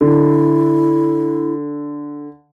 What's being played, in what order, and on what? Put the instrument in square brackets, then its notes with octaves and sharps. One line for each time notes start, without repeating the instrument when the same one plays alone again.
[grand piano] D3 [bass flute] E4